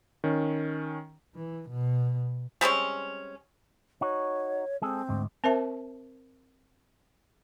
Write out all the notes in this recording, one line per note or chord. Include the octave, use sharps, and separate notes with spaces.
D#3 C#4
E3
B2
G3 G#3 C4 C#4
D#4 F#4 C#5
G#3 C4 G#4 A4
D2 G#2
C4 A#4 C5 E5 A5